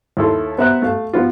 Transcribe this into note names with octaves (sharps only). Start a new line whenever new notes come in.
D#2 E4 A4 C6
B3 C4 E5 A#5 F#6
A3 F5
F3 B3 F4